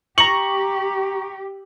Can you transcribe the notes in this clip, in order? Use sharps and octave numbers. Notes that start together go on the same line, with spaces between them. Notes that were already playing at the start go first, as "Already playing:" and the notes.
G4 A#5 C#6 F#7